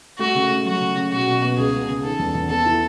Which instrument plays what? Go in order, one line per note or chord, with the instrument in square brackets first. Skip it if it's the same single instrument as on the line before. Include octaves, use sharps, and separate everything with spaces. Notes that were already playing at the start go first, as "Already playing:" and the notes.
[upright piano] A3 [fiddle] F#4
[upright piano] C#3
A3
[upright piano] F#3 [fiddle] F#4
[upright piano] C#3
C#3
[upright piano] B2 [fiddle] F#4
[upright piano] B2
B3
[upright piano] C#2 [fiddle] G#4
[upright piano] C#3
C#3
[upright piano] D#3 [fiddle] A4
[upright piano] E2
E2
[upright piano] B3 [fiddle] A4
[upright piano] E4